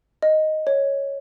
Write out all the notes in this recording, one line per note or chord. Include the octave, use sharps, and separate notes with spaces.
D#5
C#5